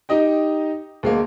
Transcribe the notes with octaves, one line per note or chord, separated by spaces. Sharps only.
D#4 G4 D#5 G5
D2 G#3 A#3